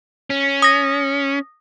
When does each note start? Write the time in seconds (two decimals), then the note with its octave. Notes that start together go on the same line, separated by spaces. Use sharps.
0.30 C#4
0.62 D#6 A#6